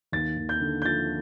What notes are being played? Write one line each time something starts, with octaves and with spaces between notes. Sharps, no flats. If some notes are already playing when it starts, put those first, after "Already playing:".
D#2 A6
D#2
G6
D3
G6
F3 A6